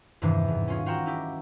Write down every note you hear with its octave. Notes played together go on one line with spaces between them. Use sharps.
E2 G2 C3 D#3 E3
G#2
C#4 F4 G#4
F4 F#4 F#5 G5 A#5 E6
D#4 E4 G4